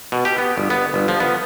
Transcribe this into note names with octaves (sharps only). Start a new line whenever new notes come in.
B2
G4
B3
G1
B3
G1
F3
B3